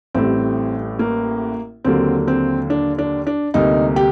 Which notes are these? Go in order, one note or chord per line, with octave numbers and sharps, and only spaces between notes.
A1 A2 G3 C4
A#3
D#2 D3 F#3 A#3 C4
C4
D4
D4
D4
D2 C3 G3 A#3 D#4
G4